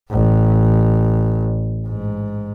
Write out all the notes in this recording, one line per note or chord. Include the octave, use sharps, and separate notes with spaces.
A1
G#2